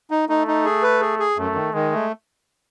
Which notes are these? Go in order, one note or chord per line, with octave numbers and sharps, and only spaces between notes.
D#4
A3 D#4
D#4
G#4
B4
G#4
G#4
F#2 A3
D#3
D#3 G#3
A3